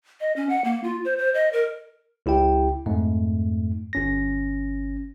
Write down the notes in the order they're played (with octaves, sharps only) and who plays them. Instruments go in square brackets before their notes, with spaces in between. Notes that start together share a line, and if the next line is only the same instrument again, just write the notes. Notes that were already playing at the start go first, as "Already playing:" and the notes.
[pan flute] D#5
C#4
F#5
A#3
F4
C5
C5
D#5
A#4
[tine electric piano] C#2 E4 G4 G5
F2 G#2 A3
G1 C#4 A#6